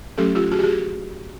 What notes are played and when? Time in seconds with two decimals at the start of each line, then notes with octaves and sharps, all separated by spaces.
0.18 F#3 A3 C#4 G4 A4
0.35 F4 G4
0.52 F#4 G#4
0.59 G4
0.63 F#4 G#4